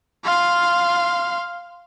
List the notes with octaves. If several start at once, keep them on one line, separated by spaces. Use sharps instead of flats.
F5 C6